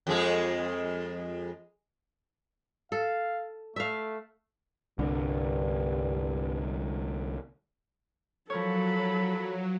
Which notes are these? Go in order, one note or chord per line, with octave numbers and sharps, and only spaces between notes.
F2 G#3 G#4
A4 F5
A3 E5 F5
C2 G2 D3
F3 F#3 A4 A#4 C#5 B5